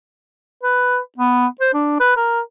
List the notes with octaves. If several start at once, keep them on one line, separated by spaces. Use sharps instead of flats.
B4
B3
C5
D4
B4
A#4